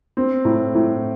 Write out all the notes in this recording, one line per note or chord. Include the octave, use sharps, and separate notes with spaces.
C4
A2
A2